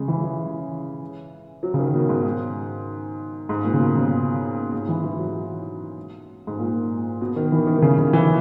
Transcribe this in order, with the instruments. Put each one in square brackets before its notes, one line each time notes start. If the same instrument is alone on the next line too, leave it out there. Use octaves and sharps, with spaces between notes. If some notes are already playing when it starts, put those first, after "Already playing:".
Already playing: [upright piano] C#3 G#3
E3
E3
F#3
C#3
D#3
B2
G#2
G#2
A#2
C#3
B2
C#3
G#2
E3
E3
F#3
G#2
A#2
B2
D#3
E3
D#3
D#3
C#3
C#3
E3